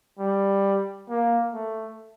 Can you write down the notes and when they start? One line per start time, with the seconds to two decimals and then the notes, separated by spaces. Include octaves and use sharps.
0.19 G3
1.10 A#3
1.54 A3